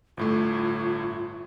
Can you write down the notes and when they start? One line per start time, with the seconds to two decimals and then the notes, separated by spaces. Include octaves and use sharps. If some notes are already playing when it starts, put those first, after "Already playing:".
0.17 G1 A2 A3 F4